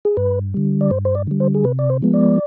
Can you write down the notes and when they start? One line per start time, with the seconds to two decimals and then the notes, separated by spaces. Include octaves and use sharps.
0.05 G#4
0.17 G2 B4
0.54 D3 G3
0.81 D5
0.91 G2 C5
1.05 C5
1.15 D5
1.27 D3 G3
1.40 C5
1.54 G#4
1.64 C3 B4
1.79 D5
1.90 C5
2.02 F3 G#3 B3
2.14 D5